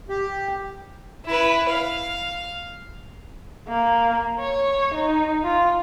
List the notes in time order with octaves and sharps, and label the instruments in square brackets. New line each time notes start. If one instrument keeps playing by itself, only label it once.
[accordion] G4
[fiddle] E4 B4
F5
[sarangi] A#3
C#5
D#4
F4